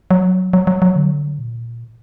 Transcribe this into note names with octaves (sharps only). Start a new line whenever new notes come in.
F#3
F#3
F#3
F#3
D3
A#2